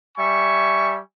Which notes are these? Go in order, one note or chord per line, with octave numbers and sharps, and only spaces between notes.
G3 E5 G#5 C#6